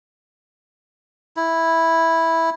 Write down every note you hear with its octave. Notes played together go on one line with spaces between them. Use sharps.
E4